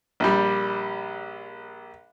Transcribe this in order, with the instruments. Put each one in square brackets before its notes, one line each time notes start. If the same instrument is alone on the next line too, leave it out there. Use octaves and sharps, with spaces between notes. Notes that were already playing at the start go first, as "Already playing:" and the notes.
[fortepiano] A#1 G3